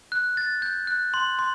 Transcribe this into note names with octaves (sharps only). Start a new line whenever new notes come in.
F#6
A6
G6
F#6
C6
C6